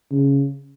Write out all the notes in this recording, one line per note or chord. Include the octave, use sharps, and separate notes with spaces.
C#3